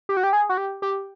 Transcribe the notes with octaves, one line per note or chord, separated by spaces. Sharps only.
G4
F#4
G4
G#4
F#4
G4
G4